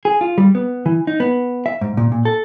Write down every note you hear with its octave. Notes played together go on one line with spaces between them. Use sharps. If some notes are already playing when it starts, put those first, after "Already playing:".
G#4
F4
G3
B3
E3
D#4
B3
E5
G#2
A#2
A#2
A4